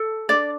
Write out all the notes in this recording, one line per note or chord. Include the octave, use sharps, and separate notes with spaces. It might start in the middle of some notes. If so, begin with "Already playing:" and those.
Already playing: A4
D4 D5